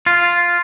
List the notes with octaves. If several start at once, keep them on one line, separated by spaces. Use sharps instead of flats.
F4